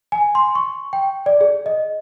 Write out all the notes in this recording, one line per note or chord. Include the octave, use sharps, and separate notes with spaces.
G#5
C6
C#6
G5
D5
G#4
D#5